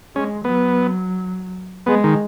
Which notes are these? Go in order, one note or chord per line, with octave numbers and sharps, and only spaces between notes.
G#3 C#4
F#3 B3
G#3 B3
D#3